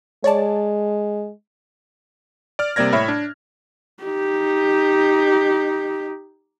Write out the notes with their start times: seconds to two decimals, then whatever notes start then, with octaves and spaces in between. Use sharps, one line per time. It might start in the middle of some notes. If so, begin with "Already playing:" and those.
0.24 G#3 C#5 D5 A5
2.59 D5 F6
2.76 C3 G3 A#3 D5 G#6 A#6
2.93 A2 C#5 E5 B5 F6
3.08 D4
4.04 D#4 G4